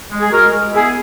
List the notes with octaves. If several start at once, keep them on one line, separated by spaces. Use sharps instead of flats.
G#3
G#4
G#3 F#4 A#4
G#3
B3 E4 G#4